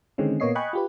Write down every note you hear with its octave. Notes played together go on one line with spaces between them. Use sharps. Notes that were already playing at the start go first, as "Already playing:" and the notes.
D3 D#3 G#3 C4 C#4
A#2 A#3 B3 C#5 D#5 C7
D#5 G5 G#5 B5 C#6 F#6
F4 G4 B4